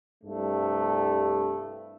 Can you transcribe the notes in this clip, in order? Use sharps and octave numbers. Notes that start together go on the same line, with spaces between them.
C2 G2 A3